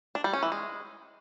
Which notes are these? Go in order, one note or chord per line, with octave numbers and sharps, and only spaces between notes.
D4
G3
C#4
E3
G#3